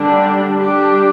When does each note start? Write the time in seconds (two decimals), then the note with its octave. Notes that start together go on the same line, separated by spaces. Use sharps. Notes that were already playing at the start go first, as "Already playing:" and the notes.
Already playing: D3 G3 D4
0.55 G3 D4 G4